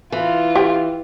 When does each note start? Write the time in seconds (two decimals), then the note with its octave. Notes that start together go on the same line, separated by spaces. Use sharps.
0.12 E3 F4
0.55 G4 G5